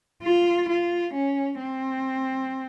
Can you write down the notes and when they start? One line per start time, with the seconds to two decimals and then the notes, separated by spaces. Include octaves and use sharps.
0.23 F4
0.68 F4
1.14 C#4
1.60 C4